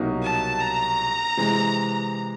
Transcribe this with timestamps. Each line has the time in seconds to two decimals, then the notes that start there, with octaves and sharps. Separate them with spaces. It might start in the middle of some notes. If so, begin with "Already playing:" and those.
Already playing: C2 B2 F#3 A#3 D#4
0.23 A5
0.61 A#5
1.37 C3 E3 G#3 C4